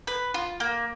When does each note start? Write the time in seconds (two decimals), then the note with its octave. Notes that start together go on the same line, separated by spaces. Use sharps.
0.07 B4
0.34 F4
0.60 A#3